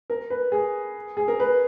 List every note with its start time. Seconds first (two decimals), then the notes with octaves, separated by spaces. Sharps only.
0.10 A#4
0.30 B4
0.52 G#4
1.17 G#4
1.28 A#4
1.40 B4